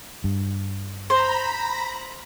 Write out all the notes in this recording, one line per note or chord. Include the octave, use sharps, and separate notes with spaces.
G2
C5 A#5 B5